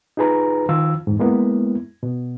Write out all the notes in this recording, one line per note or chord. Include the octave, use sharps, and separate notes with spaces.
D#4 F4 G#4 B4 A#5
D#3 F3 F4 F5 E6
E2 G#2
G#3 A#3 B3 E4
B2